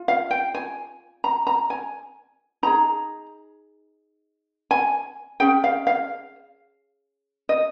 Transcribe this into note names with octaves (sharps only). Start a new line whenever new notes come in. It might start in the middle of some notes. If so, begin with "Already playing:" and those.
Already playing: F4
F5
G5
G#5
A#5
A#5
G#5
D#4 G#4 A#5
G#5
C#4 G#4 G5
F5
F5
D#5